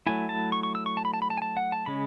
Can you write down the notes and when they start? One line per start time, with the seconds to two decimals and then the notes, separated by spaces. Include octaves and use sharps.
0.07 F#3 A3 E4 G#5
0.29 A5
0.52 C#6
0.63 C#6
0.75 E6
0.86 C#6
0.97 A5
1.05 B5
1.14 A5
1.22 B5
1.30 A5
1.37 G#5
1.42 A5
1.57 F#5
1.72 A5
1.86 C#3 G#3 C#4 B5